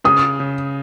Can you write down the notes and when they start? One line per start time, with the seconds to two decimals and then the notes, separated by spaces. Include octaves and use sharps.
0.04 C#3 D#6
0.40 C#3